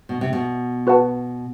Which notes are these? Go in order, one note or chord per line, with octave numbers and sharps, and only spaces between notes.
B2
C3
B2
F#4 B4 F#5 A5